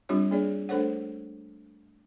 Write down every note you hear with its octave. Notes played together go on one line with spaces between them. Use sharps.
G3 C4 D4 F4 G4 C#5
A#3 D4 G#4 C#5 D5
A3 D4 A4 C5 C#5 F#5